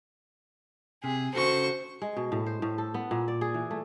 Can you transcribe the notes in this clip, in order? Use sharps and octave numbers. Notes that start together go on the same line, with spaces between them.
C3 G#4
C#3 F#4 A4 C5 C#6
G#3
B2
A2
C5
A2
A4
B3
A#2
D5
G#4
E3
A3